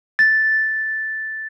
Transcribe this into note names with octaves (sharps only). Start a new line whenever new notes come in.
A6